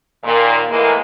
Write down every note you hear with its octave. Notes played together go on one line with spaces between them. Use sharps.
D#2 A#2
A2 E3 G#3 A#3